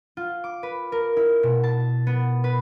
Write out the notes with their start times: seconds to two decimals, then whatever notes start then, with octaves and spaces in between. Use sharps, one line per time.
0.17 F4
0.44 D6
0.63 B4
0.92 A#4
1.17 E4
1.43 B2
1.63 A5
2.07 B3
2.44 B4